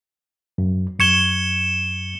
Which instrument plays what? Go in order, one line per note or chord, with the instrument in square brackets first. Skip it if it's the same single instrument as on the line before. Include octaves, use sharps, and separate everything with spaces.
[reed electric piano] F#2
[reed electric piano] F#2 C#6 G#6 [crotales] C#7 E7 G7